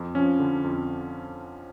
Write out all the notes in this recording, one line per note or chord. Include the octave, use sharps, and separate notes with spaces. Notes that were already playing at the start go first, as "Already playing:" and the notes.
Already playing: F2
F3 C#4
D3
F2